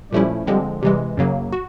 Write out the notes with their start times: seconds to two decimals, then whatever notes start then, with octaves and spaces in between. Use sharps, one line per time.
0.12 A#2 F3 G3 A3 C#4 E4 G4
0.47 D3 F3 G3 G#3 C4 G4
0.82 C3 E3 G3 G#3 G4
1.17 F#2 C#3 F#3 A#3
1.53 F#4